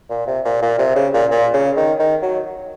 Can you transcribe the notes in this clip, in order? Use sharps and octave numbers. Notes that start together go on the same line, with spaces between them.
A#2
C3
A#2
A#2
C3
C#3
A#2
A#2
C#3
D#3
D#3
F#3